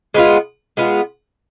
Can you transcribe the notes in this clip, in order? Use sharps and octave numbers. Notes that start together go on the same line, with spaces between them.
G#3 B3 F4
G#3 B3 F4